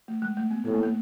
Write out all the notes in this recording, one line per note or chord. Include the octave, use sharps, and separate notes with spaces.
A3
G#3
A3
B3
A2 B3
A#3
A3